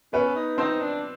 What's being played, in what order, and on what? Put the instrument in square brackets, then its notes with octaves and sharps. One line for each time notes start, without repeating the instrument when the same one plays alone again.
[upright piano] B3 B4 [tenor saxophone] C#4
[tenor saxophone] D#4
[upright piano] C4 C5 [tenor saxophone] D#4
[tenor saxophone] D4